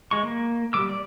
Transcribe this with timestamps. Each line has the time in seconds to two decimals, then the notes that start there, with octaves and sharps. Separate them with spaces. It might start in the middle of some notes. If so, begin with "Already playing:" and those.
0.11 G#3 C#6
0.23 A#3
0.73 G3 D6 E6
0.89 D5